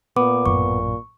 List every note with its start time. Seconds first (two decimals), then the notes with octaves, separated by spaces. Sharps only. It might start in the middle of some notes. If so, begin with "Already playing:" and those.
0.17 A#2 B3 D6
0.46 A1 F#2 C#6